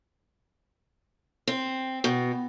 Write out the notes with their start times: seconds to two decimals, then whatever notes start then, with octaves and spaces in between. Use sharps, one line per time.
1.47 C4
2.04 B2